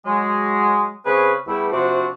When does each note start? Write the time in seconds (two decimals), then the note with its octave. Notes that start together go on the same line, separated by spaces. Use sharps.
0.05 F#3 G#3
1.06 C#3 C4 C#4 G#4 B4
1.47 E2 G3 A3 E4
1.72 C3 F3 C4 D4 F#4